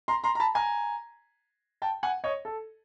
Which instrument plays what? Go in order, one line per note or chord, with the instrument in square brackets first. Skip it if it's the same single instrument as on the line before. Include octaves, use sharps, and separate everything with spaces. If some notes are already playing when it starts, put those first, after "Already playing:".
[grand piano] A#5 C6
A#5 C6
A#5
A5 B5
G#5 A#5
G5 A5
F#5 G#5
C#5 D#5
A4